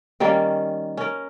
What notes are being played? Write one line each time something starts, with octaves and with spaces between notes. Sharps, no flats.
D#3 G3 A#3 C#4
C#4 A#4